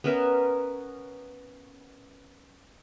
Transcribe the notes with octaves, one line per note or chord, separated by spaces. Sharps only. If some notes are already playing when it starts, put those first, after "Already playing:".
B3 C#4 A#4 E5